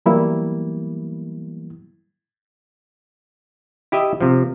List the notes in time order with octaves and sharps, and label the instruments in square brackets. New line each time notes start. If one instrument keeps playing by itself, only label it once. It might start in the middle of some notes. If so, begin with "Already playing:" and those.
[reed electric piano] E3 F#3 G3 A#3 B3 E4
[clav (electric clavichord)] E4 G4 D#5 E5
C3 F3